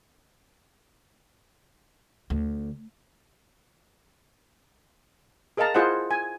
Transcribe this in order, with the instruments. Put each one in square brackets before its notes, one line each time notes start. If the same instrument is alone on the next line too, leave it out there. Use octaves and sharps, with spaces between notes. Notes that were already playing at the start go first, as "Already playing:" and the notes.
[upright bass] D2
[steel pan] G#4 A#4 D#5 F5 A5 A#5
E4 F4 G#4 C5 D#5 F#5
G#5